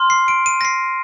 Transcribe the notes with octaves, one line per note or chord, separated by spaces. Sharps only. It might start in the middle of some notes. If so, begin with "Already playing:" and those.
Already playing: C6 F6
C7
D7
D#7
A#6
C7